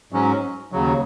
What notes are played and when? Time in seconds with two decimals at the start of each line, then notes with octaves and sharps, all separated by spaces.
0.12 G#2 F#3 C#4
0.72 D#2 C#3 F#3